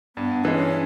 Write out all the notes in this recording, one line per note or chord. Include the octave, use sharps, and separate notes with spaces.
G2 B3
E3 G#3 C#4 D#4